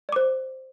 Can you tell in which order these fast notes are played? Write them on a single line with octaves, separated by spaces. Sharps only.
D5 D6 C5